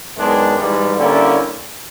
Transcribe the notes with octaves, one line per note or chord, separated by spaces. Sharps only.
F#2 D#3 G#3 B3 D4
G#2 E3 G3
D3 G3 A#3 C#4 E4